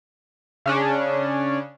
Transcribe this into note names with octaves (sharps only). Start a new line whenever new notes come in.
C#3 C#4 D4